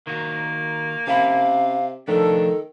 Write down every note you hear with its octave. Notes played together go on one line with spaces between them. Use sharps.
D#3 A#3 F#4
C3 C#4 F5 A5 B5
D#3 F3 A3 D4 A4